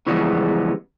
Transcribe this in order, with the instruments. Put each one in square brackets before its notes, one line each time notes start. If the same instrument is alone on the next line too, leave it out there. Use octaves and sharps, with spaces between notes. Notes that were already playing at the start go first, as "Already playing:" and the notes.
[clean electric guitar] C#3 E3 F3 G3 G#3 B3